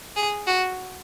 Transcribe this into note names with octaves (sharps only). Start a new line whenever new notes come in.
G#4
F#4